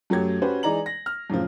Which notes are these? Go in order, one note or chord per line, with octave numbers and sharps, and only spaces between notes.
F#2 F#3 A3 G4 G#6
C#4 F#4 G4 B4 C5
E3 G#3 D#4 D5 A#5 F#7
A#6
F6
F#2 A2 C#3 F3